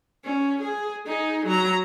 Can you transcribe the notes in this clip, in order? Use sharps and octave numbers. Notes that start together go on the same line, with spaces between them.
C#4
G#4
D#4 G#4
F#3 A#5